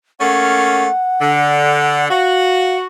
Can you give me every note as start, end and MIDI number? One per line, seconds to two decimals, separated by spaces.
0.20 0.86 57
0.20 0.86 58
0.20 0.86 61
0.20 2.05 78
1.21 2.10 50
2.10 2.86 66
2.10 2.76 77